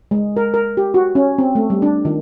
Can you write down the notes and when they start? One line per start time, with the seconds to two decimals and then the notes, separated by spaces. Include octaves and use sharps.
0.11 G#3
0.37 A#4
0.54 A#4
0.77 G4
0.94 F#4
1.15 C#4
1.38 C4
1.55 A3
1.70 G3
1.82 D4
2.05 D#3